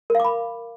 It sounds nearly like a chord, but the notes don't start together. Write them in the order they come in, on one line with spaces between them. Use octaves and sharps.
A#4 F5 D6 B5